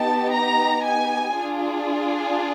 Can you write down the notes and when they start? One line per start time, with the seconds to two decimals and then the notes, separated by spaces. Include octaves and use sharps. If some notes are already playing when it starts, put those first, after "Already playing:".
Already playing: B3 D#4 G4 A5
0.32 A#5
0.84 G#5
1.36 D4 F4 G#4